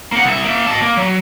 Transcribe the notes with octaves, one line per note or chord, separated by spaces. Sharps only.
A#3 F#5
C2 E5
A#3 E5
D#5 A5
A#3
F#3